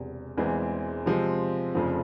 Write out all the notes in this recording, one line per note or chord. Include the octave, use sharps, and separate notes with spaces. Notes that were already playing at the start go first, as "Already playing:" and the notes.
Already playing: E1 E2 C3
E1 E2 E3 G#3 C4
C3 F3 G#3 C4
F1 F2 C#3 F3